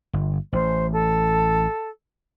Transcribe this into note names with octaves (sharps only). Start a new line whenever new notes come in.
G1
A1 C5
A4